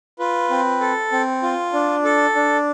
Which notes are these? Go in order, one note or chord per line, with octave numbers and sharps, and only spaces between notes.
F4 B4
C4
A4
C4
F4
D4
A4
D4